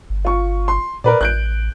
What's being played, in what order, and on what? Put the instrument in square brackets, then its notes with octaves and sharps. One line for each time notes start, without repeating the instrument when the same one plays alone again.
[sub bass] G1
[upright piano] F4 C#6
C6
[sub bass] A#2 [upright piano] A#4 B4 D5
[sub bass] A1 [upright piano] F#6 G6 D7